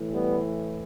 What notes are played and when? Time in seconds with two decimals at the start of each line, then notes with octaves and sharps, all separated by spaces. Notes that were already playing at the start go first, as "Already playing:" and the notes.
Already playing: A2 E3
0.12 G3 B3